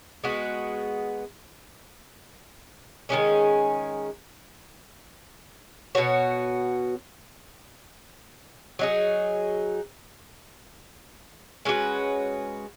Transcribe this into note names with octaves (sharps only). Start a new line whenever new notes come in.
G#3 B3 F#4
D#3 G#3 C#4 G#4
B2 B3 F#4 C#5
F#3 D#4 G#4
G#3 C#4 F#4 B4